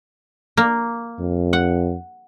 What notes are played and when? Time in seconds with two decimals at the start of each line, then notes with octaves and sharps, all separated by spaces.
0.57 A#3
1.20 F2
1.53 F#5